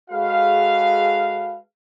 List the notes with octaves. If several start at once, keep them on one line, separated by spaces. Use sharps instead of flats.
G#3 F#4 G#4 A4 B4 F5